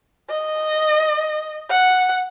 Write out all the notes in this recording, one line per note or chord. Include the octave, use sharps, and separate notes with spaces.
D#5
F#5